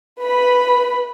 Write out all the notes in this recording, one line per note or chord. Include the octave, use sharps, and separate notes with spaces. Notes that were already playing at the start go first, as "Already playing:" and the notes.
B4 B5